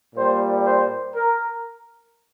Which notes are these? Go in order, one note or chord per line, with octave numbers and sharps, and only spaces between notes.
A#2 G3 C5
C5
A#4